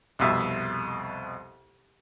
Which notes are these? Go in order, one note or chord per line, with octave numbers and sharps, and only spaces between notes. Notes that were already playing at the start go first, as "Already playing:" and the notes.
C2 F2 B2 E5